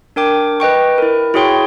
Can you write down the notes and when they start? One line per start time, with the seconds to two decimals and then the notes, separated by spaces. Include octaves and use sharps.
0.16 D4 A#4 G5 D6
0.60 B4 D#5 G5 C#6
0.98 E4 A#4
1.34 E4 F#4 G#4 C#5 G5 C6